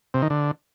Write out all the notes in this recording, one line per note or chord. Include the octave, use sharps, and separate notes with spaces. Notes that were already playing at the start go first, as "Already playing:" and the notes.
C3
D#3
D3